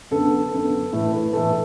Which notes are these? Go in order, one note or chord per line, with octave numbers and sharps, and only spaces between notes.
F#2 D3 B3 A4
F#2 D3 B3
A2 E3 A3 E4
B4
A2 E3 A3 A4